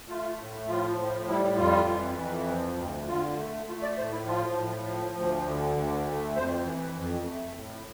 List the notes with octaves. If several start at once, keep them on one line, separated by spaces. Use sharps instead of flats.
A3 F4
A2
F3 F4
A2
G3 E4
F2 F4
E3
F2
F3
D2
D3 F4
A3
A3 F4
D5
A2 C5
E4
F3 F4
A2
F3
D2
D3
D2
A3
F2 C5
E3
F2
A3
A2